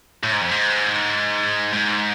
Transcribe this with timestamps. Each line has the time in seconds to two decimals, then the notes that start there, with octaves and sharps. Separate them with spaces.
0.23 A2
0.32 G#2
0.42 F2
0.51 G#2
1.74 G#2